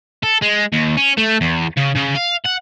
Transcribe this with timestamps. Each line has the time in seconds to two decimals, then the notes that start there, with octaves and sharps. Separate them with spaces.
0.23 A4
0.42 G#3
0.73 D#2
0.97 C#4
1.18 A3
1.41 E2
1.77 C#3
1.96 C#3
2.15 F5
2.45 F#5